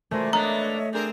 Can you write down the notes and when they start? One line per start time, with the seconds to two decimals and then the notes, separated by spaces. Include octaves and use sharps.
0.11 A#2 A3 F#4 A#4 C5 G#5
0.33 A#3 B3 D4 C#5 D#5 E5 A#5
0.93 C4 D4 G#4 A#4 G6